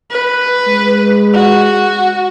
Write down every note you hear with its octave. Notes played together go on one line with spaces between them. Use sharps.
B4
G#3
F#4